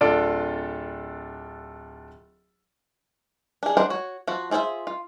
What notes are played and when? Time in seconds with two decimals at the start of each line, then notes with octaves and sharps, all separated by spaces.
0.01 D1 D4 F4 A4 D5 D7
3.63 D4 G#4
3.77 G#3 D4 A#4 C5 F#5
3.90 F#4 C#5
4.28 F3 F#4
4.51 F4 G#4 C5 C#5 E5
4.87 F4